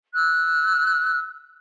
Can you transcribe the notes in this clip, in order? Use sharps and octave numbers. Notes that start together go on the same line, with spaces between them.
E6 F#6